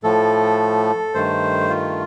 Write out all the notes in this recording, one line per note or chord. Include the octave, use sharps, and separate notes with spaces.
A2 F3 A3 A4
G2 D#3 A3 C5
F4